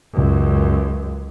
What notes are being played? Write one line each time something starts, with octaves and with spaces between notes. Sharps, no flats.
C#2 F#2